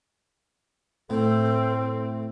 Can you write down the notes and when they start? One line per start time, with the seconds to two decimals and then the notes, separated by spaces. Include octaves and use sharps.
1.10 A2 C4 A4